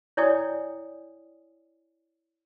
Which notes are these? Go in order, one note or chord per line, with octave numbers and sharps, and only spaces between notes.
E4 C#5 D5 G5 G#5 D#6